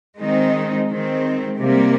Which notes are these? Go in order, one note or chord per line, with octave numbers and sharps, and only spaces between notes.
D#3 G#3 C4 D#4
D#3 G#3 C4
C3 G3 A#3